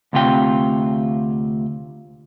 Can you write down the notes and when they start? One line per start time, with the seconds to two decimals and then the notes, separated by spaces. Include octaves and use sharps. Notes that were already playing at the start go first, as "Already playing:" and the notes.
0.13 D2 C3 F4 G5